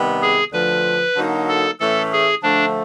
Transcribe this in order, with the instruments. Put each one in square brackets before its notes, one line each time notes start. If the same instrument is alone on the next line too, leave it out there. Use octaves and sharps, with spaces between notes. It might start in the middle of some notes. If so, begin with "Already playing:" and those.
Already playing: [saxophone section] C3 D#3 G3 B3
[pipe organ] G#4
[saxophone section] D2 D3 F3 [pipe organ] B4
[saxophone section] D3 F#3 A#3 D#4 F#4
[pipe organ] A4
[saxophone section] A2 E3 A3 C#4 E4 [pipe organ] A4
[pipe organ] G#4
[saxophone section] D3 F3 A3 [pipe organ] D4